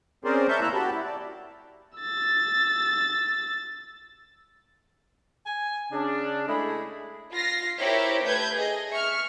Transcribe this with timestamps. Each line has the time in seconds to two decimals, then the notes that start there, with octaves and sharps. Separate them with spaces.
0.25 C4 C#4 G#4 A#4 C5 D5
0.48 A#4 E5 A5 C#6 G6
0.61 D#2 A#3 E4 A#5 E6 F#6
0.74 F#4 G4 A5 B5
0.92 E4
1.04 D5
1.98 E6 A6
5.46 G#5
5.92 C#3 D4
6.47 G#3 A3 E4 G#4 B5
7.32 F4 A#6 C7
7.77 E4 G4 A#4 C5 C#5 E5
8.24 A3 B4 G6 G#6
8.54 G#4 D#5
8.91 E5 C#6 F6